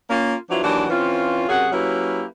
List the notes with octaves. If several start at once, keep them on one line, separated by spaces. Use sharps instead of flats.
A#3 C#4 F4
F3 F#3 B3 D4 E4 F4
D#2 E3 F#3 D4 F#5
E3 C4 C#4 F4
F#2 C3 F#3 G#4 F#5
F#3 A#3 C#4 E4 G4 B4